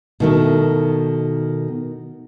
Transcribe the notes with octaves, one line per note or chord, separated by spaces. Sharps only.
B2 D#3 A3